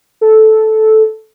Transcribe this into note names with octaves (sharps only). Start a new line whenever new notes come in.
A4